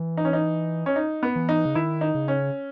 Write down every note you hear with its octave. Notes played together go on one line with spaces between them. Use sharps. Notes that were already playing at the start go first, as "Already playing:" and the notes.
Already playing: E3
D#4
C#4
D#4
C#4
D#4
B3
E3
D#4
C#3
D#3 E4
D#4
C#3
C#4